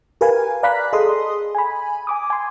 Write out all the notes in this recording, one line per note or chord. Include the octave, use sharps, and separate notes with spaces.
G4 A#4 B4 F5 G#5
D5 F5 A#5 B5 F#6 B6
G#4 A4 D#5 C6 D#6
G#5 B5
G#5 D6 D#6
G#5 C6